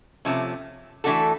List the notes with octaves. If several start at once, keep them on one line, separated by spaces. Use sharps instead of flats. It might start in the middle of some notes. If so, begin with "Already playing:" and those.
C3 F3 A3 C#4
E3 A3 D4 F#4 A4